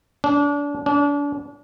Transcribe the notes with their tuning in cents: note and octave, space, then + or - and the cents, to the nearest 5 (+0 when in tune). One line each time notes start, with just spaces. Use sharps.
D4 -30
D4 -35